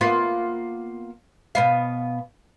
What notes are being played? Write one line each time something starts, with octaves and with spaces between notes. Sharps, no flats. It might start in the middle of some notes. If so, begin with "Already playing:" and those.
A#3 B3 F4
B2 B3 F5